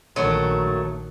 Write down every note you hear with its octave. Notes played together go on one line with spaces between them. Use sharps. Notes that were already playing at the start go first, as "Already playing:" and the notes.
A#1 D#3 F#3 A3